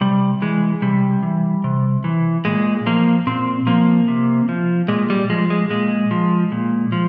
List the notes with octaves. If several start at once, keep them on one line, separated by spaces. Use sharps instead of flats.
C3 G3
E3 G#3
C3 G3
E3
C3
E3
A#2 G#3
F3 A#3
A#2 C4
F3 A#3
C3
F3
A#2 G#3
G3
F3 G#3
G#3
A#2 G#3
F3
A#2
F3